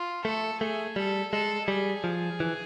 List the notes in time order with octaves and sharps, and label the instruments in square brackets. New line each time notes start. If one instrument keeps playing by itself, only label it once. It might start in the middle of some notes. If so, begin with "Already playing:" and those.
Already playing: [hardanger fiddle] F4
[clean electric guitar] A3 [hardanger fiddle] A4
[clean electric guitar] A3 [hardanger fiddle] G#4
[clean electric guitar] G3 [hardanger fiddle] A4
[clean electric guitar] G#3 [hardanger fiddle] A4
[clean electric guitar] G3 [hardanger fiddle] G#4
[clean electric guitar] F3
E3